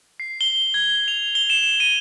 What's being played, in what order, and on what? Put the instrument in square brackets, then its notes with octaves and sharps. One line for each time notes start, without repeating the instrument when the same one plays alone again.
[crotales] C7
G7
G#6
F7
G7
E7
D#7